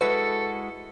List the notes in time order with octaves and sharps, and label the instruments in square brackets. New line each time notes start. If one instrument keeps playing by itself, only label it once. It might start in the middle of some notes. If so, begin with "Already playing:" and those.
[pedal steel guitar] G#3 E4 F#4 [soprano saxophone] A4 [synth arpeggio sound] B4